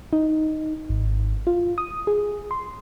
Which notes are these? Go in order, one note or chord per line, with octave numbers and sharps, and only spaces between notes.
D#4
G#1
F4
D#6
G#4
C6